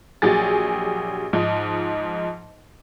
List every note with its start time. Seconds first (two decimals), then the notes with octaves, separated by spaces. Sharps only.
0.22 A#1 F#3 G4 G#4 A6
1.33 G#2 F3 D#4